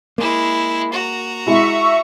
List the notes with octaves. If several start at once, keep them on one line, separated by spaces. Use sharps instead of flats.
G#3 A#3 E4
F#4 A#5
G#3 E4 E5 C#6